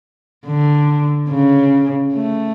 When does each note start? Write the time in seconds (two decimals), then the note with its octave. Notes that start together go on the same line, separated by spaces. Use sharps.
0.46 D3
1.30 C#3
2.13 A3